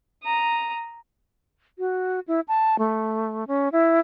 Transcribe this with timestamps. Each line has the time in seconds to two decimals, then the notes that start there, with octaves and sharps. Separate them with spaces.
0.23 A#5 D#6
1.79 F#4
2.28 E4
2.48 A5
2.79 A3
3.48 C#4
3.72 E4